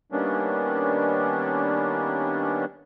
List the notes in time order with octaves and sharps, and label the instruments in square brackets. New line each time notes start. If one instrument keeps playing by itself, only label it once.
[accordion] D#3 G3 A#3 B3 C#4 D4